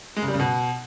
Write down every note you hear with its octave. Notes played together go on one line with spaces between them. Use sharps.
G#3
C#3
G3
C#3
B2